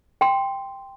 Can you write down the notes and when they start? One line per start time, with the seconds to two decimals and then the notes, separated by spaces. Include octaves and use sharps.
0.21 G5 C6